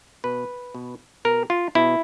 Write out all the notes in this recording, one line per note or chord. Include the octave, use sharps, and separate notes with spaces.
B2 B4
B2
B2 A#4
F4
B2 E4